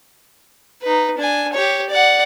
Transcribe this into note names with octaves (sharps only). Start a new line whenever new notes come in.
D#4 B4
D4 G#5
G4 C#5
D5 F#5